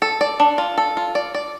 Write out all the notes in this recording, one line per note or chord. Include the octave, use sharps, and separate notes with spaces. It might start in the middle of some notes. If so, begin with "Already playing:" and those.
A4
D5
D4
F4
A4
F4
D5
D5